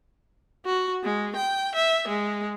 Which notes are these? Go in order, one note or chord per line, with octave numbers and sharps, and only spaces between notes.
F#4
G#3
G5
E5
G#3